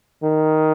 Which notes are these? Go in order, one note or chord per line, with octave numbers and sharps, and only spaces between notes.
D#3